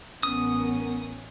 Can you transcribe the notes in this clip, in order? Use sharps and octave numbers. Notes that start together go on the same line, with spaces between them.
A1 B3 C#4 A#4 D#6